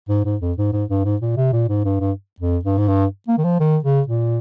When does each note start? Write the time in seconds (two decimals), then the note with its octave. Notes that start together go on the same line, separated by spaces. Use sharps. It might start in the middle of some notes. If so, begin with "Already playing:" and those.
0.09 G#2
0.25 G#2
0.41 F2
0.58 G#2
0.73 G#2
0.90 G2
1.05 G#2
1.22 A#2
1.37 C3
1.53 A#2
1.69 G#2
1.85 G2
2.00 G2
2.40 F2
2.65 G2
2.78 G#2
2.88 G2
3.28 A#3
3.38 D#3
3.44 F3
3.60 D#3
3.84 C#3
4.08 A#2